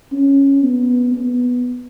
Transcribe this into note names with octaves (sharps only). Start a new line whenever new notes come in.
C#4
B3
B3